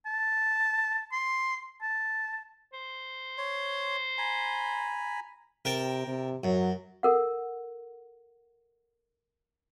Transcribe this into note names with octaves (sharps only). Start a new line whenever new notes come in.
A5
C6
A5
C5
C#5 C6
G#5 A#5 B5
C3 A#4 G5 A5
C3
F#2 F#3
A4 A#4 F#5